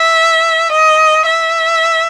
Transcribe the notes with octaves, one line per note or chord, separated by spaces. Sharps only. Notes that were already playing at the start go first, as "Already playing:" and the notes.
Already playing: E5
D#5
E5